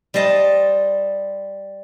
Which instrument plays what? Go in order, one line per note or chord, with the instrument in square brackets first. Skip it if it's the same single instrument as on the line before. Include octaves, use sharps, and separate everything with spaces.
[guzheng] G3 C5 D#5 A5